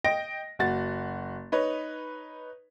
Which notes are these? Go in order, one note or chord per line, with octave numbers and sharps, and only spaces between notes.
D#5 G5 A#6 D7
F#1 F#4 A6
D#4 B4 C#5